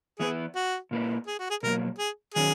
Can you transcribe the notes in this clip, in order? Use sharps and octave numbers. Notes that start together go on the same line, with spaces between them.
E3 B3 E4 G#4 B4
F#4
A#2 A#3 E4 B4
G#4
F#4
G#4
B2 F#3 A#3 A#4
G#4
D#3 F#3 C#4 G#4